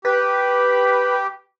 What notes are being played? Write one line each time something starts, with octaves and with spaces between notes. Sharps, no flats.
G4 B4